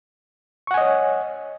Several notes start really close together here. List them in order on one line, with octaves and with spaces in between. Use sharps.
C#6 F#5 G#5 D#5 C#5